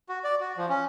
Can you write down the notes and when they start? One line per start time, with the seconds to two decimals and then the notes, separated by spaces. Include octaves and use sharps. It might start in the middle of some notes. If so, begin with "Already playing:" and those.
0.09 F#4
0.24 D5
0.40 F#4
0.57 F3
0.69 C#4